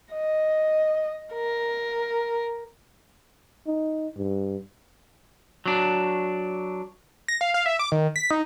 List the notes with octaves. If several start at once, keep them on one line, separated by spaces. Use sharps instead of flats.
D#5
A#4
D#4
G2
F#3 D4
A#6
F5
F5
E5
D6
D#3
B6
D#4